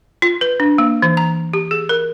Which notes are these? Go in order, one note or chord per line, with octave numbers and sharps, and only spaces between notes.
F4
B4
D4
A#3
E3
A#5
G4
G#4
A#4